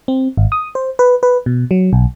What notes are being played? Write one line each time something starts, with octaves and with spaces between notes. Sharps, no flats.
C4
G#1
D#6
C5
B4
B4
B2
F#3
B1